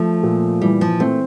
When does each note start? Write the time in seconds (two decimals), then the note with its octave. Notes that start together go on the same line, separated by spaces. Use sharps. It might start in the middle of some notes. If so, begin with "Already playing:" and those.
Already playing: F3 A3
0.23 A#2
0.62 E3 G3
0.81 F3
1.00 A3 C4